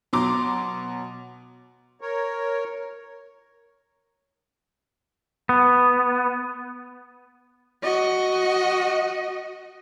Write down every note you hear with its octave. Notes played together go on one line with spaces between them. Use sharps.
B2 F#3 A#5 C6 D6
A#4 C#5
B3
F#4 D#5